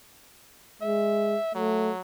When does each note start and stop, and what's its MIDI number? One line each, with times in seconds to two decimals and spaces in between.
0.82 1.36 56
0.82 1.53 76
1.55 2.01 54
1.55 1.90 57